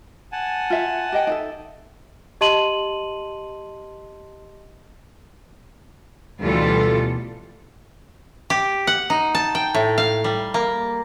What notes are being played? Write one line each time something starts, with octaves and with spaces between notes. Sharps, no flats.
F#5 G#5 A5
F4 E5 F5
G4 D#5 G5
D#4 A4 E5
G4 D#5 A5 C6 D#7 F#7
D2 B2 E3 G3 F4 A4
G4
F#5
D#4
A5
G5
A2
F5
G3
A#3